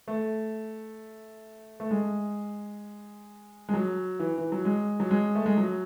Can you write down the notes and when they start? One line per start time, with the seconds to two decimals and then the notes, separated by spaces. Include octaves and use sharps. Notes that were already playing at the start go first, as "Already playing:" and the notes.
0.08 A3
1.80 A3
1.91 G#3
3.69 G#3
3.74 F#3
4.19 E3
4.38 E3
4.52 F#3
4.65 G#3
5.00 F#3
5.11 G#3
5.35 A3
5.46 G#3
5.57 F#3